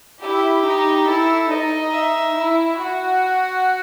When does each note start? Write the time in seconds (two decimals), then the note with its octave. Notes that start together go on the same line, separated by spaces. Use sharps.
0.21 E4 G4
0.65 D#4
1.08 E4 A4
1.50 D#4 D#5
1.94 E5
2.37 E4
2.80 F#4